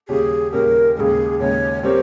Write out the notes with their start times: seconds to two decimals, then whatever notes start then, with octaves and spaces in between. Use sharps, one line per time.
0.09 D#2 C#3 G3 C#4 G4 G#4
0.52 D#2 C#3 G3 C#4 G4 A#4
0.96 D#2 C#3 G#3 G#4 A#4
1.40 D#2 C#3 G#3 C#5
1.83 G3 C4 G4 A#4 C5 C#5